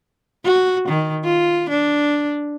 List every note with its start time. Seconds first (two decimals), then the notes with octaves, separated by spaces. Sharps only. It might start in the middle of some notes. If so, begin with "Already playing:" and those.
0.45 F#4
0.88 D#3
1.24 F4
1.69 D4